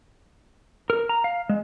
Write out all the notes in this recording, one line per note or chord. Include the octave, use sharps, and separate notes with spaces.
A#4
A#5
F5
G#3